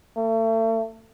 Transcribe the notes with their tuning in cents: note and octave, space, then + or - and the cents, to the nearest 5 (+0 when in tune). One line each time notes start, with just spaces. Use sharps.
A3 +35